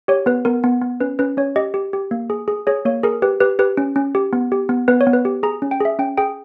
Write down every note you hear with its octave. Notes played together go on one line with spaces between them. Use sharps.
G4 C#5
B3 B4
B3 A#4
B3
B3
C#4 B4
C#4 B4
C#4 C#5
G4 D#5
G4
G4
A#3
G#4
G#4
G#4 C#5
A#3 C#5
G#4 A#4
G4 B4
G4 B4
G4 B4
C#4
C#4
G4
B3
G4
B3
B3 B4
C#5
B3
B4
G4
G#4 A#5
C#4
G5
G#4 E5
C#4 G5
G#4 G5